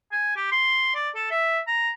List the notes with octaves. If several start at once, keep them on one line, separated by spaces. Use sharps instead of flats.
G#5
G4
C6
D5
A4
E5
A#5